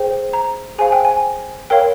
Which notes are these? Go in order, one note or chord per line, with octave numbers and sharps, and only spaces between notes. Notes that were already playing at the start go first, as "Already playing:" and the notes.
Already playing: G#4 C5 G5
A#5
G#4 C5 F5 G#5
G5
G#5
A#4 C#5 F5 G5